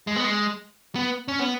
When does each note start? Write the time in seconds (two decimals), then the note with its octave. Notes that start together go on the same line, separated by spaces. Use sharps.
0.07 G#3
0.16 B3
0.24 G#3
0.95 B3
1.28 C#4
1.39 B3